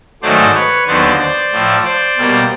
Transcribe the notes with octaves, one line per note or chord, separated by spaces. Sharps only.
G#2 D#3 F#3 A3 C5 D5
B4 C#5
D#2 D3 F#3 B3 C5 D5
C5 D5
A2 F3 A3
C5 D5
B2 G3 A#3